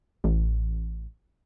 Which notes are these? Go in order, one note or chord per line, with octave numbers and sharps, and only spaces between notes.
A1